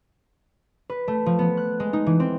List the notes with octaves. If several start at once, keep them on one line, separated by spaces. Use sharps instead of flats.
B4
A3
F3
B3
F#6
G#3
D#4
E3
C4